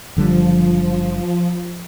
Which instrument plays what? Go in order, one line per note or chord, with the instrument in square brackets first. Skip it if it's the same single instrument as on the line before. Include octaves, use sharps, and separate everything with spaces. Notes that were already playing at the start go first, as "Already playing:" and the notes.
[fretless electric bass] F#1 D3 G3 [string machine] F3